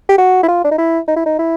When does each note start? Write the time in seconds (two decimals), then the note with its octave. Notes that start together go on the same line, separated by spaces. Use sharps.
0.09 G4
0.18 F#4
0.43 E4
0.48 F4
0.65 D4
0.71 D#4
0.78 E4
1.08 D#4
1.17 E4
1.26 D#4
1.39 E4